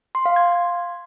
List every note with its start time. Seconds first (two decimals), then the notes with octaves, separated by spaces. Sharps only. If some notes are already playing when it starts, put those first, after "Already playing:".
0.15 C6
0.26 F5
0.36 G#6